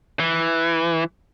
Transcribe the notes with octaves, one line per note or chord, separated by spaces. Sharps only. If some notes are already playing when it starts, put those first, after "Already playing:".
E3